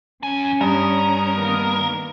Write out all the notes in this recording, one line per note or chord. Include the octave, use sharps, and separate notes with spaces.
F#2 C#4 G#5
G2 A#4 D#6
D#3 A#3 B3